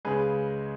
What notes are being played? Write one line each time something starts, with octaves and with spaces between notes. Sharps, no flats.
C#2 C#3 G#3 G#4 B4